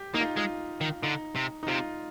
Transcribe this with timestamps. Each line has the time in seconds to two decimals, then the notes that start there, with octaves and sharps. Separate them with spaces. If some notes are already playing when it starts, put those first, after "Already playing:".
Already playing: G4
0.14 A#3 D#4
0.21 F4
0.37 G#3 F4
0.81 D#3
1.03 D3 D#4
1.35 C3
1.63 D#4
1.68 C3 F4